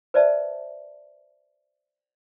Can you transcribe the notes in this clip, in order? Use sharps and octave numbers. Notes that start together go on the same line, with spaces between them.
B4 C5 D5 E5 A5